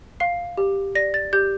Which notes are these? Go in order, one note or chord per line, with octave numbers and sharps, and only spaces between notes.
F5 C7
G4
D5 A#6
A6
G4 G6